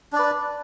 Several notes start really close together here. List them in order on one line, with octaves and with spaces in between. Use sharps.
D4 D5 B4